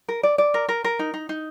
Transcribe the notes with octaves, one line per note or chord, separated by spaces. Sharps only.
A#4
D5
D5
A#4
A#4
A#4
D#4
D#4
D#4